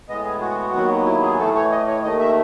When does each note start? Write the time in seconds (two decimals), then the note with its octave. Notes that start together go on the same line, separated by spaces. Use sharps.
0.08 A2 G#3 B3 D#5
0.25 G#4
0.41 F#4
0.73 D#2 D#3 F#3 B3
1.06 E4
1.23 G#4
1.39 A2 E3 A3 A4
1.55 C#5
1.71 D#5
1.87 C#5
2.03 D#2 D#3 A3 D#5
2.20 E5